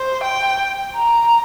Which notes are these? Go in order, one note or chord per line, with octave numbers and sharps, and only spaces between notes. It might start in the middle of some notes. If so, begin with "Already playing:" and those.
Already playing: C5
G5
A#5